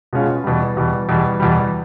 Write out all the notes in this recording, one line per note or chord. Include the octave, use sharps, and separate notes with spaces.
B2 G#3 C#4 F4
E2 B2 G3
E2 B2 G3
E2 B2 G3
E2 B2 G3